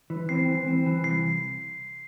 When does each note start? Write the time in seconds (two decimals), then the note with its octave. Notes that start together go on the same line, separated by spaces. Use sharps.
0.10 E3
0.29 C4 C7
0.48 E3
0.66 C4
0.86 E3
1.04 C2 C7